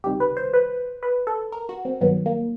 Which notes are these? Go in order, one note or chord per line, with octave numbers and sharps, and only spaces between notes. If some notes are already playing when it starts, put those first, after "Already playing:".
C#2 C3 D#3 G3 G4
B4
C5
B4
B4
A4
A#4
F#4
C4
G2 D#3 F#3 B3
A#3